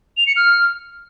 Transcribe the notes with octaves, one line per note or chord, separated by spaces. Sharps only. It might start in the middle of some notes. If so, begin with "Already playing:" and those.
F7
C#7
F6